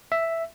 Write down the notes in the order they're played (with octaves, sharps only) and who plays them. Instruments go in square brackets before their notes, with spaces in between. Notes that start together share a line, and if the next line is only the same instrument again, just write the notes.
[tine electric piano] E5